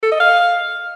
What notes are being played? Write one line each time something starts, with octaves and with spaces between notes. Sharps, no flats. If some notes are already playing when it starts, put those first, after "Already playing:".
A4
D#5
F5